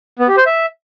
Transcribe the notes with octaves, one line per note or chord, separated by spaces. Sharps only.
B3
G4
C5
E5